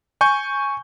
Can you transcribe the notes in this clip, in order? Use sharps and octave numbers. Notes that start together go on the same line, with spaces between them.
G#5 C#6 G6